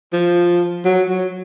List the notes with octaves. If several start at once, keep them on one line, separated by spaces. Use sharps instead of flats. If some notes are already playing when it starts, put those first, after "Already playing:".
F3
F#3
F#3